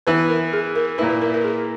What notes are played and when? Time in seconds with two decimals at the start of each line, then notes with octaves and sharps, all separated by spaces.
0.07 E3 B3 E4 B4
0.29 A#4
0.53 G#4
0.75 A#4
0.98 A#2 A#3 E4 B4
1.10 B4
1.21 A#4
1.34 A#4
1.44 G#4